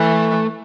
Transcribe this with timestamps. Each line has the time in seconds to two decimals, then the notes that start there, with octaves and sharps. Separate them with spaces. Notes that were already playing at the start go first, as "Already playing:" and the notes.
Already playing: E3 A3